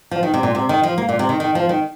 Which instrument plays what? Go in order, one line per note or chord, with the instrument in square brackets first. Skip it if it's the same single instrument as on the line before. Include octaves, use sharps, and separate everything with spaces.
[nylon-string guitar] F3
D#3
C3
A#2
C3
D#3
F3
A#3
A#2
C3
D#3
D#3
F3
D#3